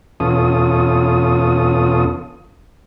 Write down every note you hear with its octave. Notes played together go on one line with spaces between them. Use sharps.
E2 B2 C#4 F4 A4 D#6